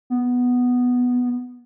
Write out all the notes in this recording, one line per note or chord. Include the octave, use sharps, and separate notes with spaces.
B3